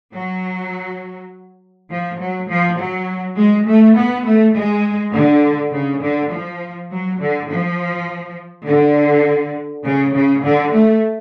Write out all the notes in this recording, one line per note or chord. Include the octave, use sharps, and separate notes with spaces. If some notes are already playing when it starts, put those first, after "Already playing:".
F#3
F3
F#3
F3
F#3
G#3
A3
B3
A3
G#3
D3
C#3
D3
F3
F#3
D3
F3
D3
C#3
C#3
D3
A3